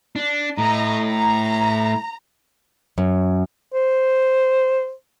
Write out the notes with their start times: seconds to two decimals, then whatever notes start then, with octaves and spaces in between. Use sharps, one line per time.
0.16 D4
0.58 A2 D#5 A#5
1.08 A#5
2.98 F#2
3.74 C5